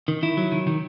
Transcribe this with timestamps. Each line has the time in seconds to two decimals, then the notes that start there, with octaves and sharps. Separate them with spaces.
0.08 D#3
0.23 D#3 E4
0.37 F#3
0.52 D#3
0.67 D#3